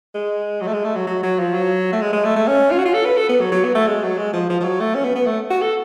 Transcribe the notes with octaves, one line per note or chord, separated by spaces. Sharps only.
G#3
F#3
A3
G#3
A3
F#3
F#3
F#3
F3
F#3
A3
G#3
G#3
A3
A3
C#4
F4
F#4
F4
A4
B4
A4
B3
F#3
F#3
B3
A3
G#3
F#3
G#3
F3
F3
F3
F#3
A3
C#4
B3
B3
A3
F#4
A4